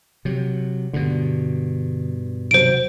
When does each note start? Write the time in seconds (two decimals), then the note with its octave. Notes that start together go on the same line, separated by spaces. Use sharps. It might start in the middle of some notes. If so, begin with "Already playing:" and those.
0.25 C3 F#3
0.93 G2 B2 D3
2.51 D#2 C3 F#3 C5 D7